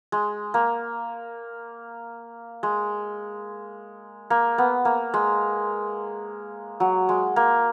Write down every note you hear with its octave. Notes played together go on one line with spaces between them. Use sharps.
G#3
A#3
G#3
A#3
B3
A#3
G#3
F#3
G#3
A#3